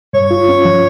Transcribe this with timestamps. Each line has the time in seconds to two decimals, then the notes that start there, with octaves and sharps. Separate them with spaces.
0.13 G2 C#5
0.31 F4
0.49 C#4
0.65 F3